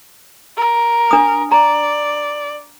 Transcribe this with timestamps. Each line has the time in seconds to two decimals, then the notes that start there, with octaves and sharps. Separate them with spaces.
0.57 A#4
1.11 D4 D#6
1.52 D5 A#5